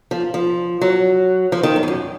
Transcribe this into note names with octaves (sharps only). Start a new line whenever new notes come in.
F3
F3
F#3
F3
D#3
F#2
F2
F#2